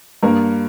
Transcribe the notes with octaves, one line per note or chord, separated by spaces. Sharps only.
G2 A#3 A#4